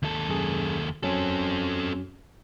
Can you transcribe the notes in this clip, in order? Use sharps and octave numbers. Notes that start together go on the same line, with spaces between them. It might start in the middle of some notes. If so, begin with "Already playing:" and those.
D#2 A4
F#2 G#4
F#2 C4 C#4 F#4 A4